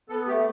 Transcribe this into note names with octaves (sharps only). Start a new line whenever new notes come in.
B3 A4
A3 G4